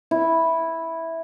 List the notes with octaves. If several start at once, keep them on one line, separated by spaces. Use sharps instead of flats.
E4